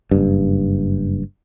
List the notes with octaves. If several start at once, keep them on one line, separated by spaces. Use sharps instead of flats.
F#1 G2